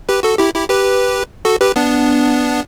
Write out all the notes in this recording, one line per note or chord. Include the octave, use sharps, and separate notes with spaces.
G4 B4
F#4 A4
E4 G4
E4 G4
G4 B4
F#4 A4
G4 B4
B3 D4